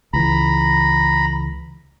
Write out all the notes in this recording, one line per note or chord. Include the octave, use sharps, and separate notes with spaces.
C#2 E3 A#5 B5